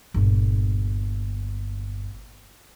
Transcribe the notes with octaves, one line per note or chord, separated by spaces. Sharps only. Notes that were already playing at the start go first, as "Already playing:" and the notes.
G1 A#2